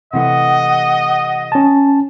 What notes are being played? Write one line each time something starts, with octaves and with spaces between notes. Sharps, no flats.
C3 E3 A3 D#5 F#5
C#4 A5